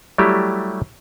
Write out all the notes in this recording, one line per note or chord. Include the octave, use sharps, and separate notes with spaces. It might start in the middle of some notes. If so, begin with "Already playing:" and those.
F#3 G3 A3 E4 G4